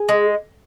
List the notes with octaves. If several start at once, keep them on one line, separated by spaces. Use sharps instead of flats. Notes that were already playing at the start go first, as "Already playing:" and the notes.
Already playing: G#4
G#3